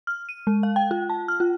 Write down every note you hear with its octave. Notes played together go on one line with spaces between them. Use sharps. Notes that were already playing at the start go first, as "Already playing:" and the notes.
F6
D#7
G#3
F5
G5
F4
A5
F6
F4